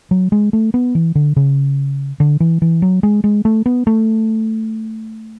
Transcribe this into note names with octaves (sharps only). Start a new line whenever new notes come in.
F#3
G#3
A3
B3
E3
D3
C#3
D3
E3
E3
F#3
G#3
G#3
A3
B3
A3